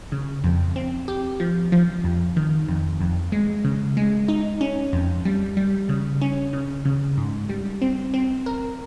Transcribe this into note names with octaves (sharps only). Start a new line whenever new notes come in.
C#3
F2
C4
G4
F3
F3
F2
D#3
F2
F2
G#3
C#3
G#3
D#4
C#4
F2
G3
G3
C#3
C#4
C#3
C#3
G#2
G3
C4
C4
A#4